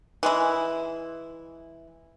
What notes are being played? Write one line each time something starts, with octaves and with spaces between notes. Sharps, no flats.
E3 G#3 E4